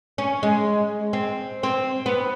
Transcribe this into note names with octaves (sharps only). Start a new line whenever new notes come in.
C#4
G#3
C4
C4
B3